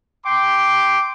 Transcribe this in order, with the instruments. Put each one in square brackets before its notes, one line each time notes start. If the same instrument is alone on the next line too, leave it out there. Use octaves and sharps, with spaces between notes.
[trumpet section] G5 C6 D6